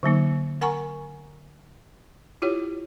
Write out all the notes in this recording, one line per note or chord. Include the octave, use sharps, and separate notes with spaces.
D3 F#3 A#3 D#4
A#4 F#5 G#5 A#5 C#6
E4 F4 G4 C#5